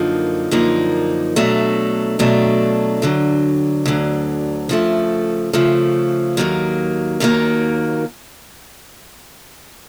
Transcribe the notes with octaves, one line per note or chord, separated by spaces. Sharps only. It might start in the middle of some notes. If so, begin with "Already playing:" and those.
Already playing: F#2 D3 F3 A#3 D#4
F#2 D3 F3 A#3 D#4
B2 F#3 A3 D4
B2 F#3 A3 D4
D2 D3 F#3
D2 D3 F#3
C#3 F3 A3
C#3 F3 A3
D#2 D#3 F#3 A#3
D#2 D#3 F#3 A#3